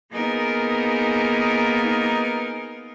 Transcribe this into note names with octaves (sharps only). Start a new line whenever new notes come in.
A#3 B3 D#4 F4 G#4 A#4